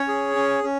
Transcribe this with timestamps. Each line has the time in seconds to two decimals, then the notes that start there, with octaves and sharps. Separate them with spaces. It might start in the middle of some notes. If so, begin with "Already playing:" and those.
Already playing: C#4 C#5
0.08 G#4
0.36 C#4
0.63 C#4